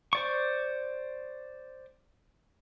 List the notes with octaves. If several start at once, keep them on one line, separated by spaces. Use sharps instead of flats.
C5 D5 C#6